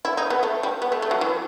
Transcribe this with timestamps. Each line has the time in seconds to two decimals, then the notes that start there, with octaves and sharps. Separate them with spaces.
0.05 E4
0.17 D#4
0.30 B3
0.43 A3
0.63 G3
0.82 B3
0.92 A3
1.02 A3
1.11 F#3
1.21 E3